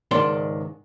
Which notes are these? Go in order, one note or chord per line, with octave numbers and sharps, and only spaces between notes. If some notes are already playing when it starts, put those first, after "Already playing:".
C#2 G#2 D#3 D4 D5 C6